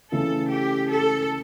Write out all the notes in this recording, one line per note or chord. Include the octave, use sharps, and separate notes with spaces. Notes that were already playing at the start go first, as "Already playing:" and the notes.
C#3 E3 A3 A4
G4
A4